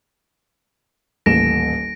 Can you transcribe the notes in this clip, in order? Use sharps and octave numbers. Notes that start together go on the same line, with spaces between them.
D#1 A1 A#6 D7 E7